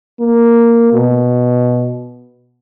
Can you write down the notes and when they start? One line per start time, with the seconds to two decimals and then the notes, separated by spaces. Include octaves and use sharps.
0.21 A#3
0.94 B2